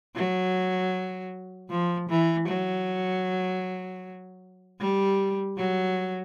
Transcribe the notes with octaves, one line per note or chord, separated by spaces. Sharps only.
F#3
F3
E3
F#3
G3
F#3